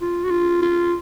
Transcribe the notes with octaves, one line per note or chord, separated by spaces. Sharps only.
F4
F#4
F4
F4